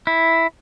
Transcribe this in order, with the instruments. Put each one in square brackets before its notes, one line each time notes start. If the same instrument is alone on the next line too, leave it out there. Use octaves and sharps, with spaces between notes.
[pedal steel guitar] E4